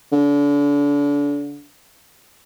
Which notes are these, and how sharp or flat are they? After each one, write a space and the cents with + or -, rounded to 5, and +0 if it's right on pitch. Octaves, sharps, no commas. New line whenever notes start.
D3 -35